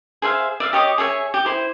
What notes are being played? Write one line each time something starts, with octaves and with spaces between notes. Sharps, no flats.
G#4 C5 E5 F5
D5 E5 F5
G4 C#5 D#5 D6
G#4 C#5 E5 G#5
G4
E4 C5